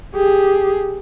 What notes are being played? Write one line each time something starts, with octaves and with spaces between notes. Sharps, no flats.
G4 G#4